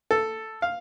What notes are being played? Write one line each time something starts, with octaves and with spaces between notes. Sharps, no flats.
A4
F5